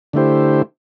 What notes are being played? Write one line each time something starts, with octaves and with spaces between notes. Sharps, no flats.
D3 A3 E4 G4 C5